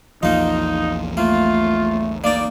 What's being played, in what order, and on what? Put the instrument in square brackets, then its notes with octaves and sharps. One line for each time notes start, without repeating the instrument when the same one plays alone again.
[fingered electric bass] A#1 E2 F3 [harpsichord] A#3 F4 [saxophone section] D#4
[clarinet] A3 [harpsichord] A#3 [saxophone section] F4
[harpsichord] A#3 D#4 [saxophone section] D5